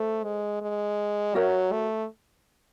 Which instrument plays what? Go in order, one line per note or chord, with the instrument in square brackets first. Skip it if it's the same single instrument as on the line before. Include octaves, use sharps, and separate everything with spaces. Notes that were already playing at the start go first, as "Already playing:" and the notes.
Already playing: [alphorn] A3 [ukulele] A4 C5
[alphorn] G#3
G#3
[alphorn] F#3 [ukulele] F#4 A#4 C#5 E5
[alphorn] A3